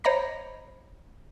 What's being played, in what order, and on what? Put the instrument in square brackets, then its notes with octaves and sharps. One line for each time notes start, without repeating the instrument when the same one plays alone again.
[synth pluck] C5 C#5 D#5 A#5 B5 A#6